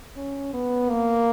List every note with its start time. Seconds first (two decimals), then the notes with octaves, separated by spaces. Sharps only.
0.16 C#4
0.53 B3
0.89 A#3